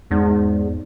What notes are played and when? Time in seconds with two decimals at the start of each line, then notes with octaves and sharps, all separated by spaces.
0.11 E2 G#2